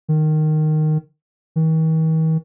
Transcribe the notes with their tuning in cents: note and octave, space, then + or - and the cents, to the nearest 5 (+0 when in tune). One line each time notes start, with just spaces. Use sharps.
D#3 -10
D#3 +45